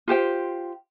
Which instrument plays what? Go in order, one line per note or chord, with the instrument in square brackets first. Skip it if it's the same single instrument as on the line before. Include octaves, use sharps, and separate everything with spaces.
[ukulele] F4 G4 C5 G5